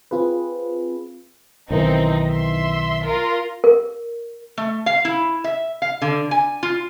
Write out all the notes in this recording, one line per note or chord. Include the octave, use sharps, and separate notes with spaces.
C4 F4 G#4 B4
B1 D#3 E3 C4 D#4
E5 C6
F4 A#4
A#4
A3
F5
E4
E5
F5
D3
G#5
F4